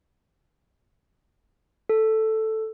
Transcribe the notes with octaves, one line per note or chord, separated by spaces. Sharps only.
A4